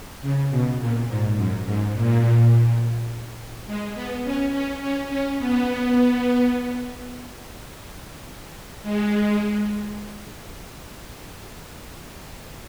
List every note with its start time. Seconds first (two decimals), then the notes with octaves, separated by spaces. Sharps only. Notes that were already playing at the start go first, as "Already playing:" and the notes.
0.22 C#3
0.51 B2
0.79 A#2
1.08 G#2
1.36 F#2
1.65 G#2
1.94 A#2
3.67 G#3
3.95 B3
4.24 C#4
4.52 C#4
4.81 C#4
5.10 C#4
5.38 B3
8.83 G#3